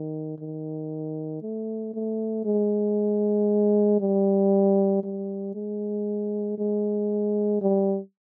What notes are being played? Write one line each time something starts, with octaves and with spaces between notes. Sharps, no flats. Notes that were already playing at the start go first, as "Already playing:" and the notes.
Already playing: D#3
D#3
A3
A3
G#3
G3
G3
G#3
G#3
G3